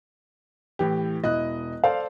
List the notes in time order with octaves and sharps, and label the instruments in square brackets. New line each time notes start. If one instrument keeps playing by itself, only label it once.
[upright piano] A2 E3 G4
[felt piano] E1 E4 F#6 [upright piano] D#5
[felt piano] A4 C5 D5 [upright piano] F5